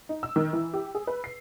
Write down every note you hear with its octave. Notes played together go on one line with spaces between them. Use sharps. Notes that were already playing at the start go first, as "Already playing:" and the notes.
D#4
E6
D#3
E3
G4
G#4
B4
C7